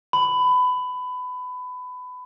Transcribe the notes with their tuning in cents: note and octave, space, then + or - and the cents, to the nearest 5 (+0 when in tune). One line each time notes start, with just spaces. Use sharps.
B5 +20